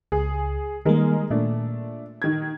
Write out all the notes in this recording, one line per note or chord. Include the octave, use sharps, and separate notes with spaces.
C#2 G#4
D#3 G3 G#3 A#3 G#4 A#4
A#2 A3 D4
D#3 G#6